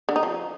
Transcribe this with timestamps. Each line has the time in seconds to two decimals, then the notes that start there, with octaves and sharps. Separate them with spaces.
0.09 D3
0.16 D#4
0.23 F3